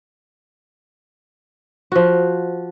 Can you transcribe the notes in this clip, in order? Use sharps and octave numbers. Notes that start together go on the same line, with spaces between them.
F3 F#4